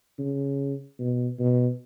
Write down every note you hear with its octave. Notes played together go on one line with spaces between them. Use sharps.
C#3
B2
B2